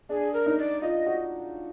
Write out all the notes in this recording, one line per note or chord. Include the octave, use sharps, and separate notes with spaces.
D4 G#4
A#4
D#4
D5
F4 D#5
F#4